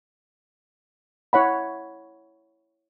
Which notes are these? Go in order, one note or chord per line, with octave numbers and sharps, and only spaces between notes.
E4 C#5 F#5 B5